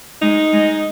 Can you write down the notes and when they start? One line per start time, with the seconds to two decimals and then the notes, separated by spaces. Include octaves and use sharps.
0.22 G#3 D#4
0.53 G#3